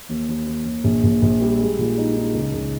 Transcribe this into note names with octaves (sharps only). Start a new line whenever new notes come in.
D#2
D#2
D#2
D#2
A#1
A#1
A#1
G3
G#3
A#2
D#4
D#4
C#2
C#2